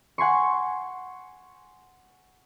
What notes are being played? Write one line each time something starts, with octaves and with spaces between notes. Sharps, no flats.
F#5 G#5 C6 C#6